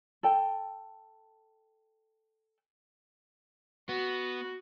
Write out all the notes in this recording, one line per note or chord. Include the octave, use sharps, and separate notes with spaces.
A4 G5
B3 F#4